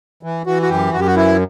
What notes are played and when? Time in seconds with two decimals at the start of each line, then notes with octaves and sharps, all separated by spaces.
0.23 E3
0.46 E3 F#4
0.62 F#4
0.69 F#2 G4
0.93 F#2 F#4
1.00 G4
1.07 F#4
1.16 E3 E4